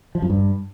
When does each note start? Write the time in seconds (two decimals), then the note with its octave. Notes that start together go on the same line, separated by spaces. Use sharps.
0.15 F3
0.22 F#2
0.30 G2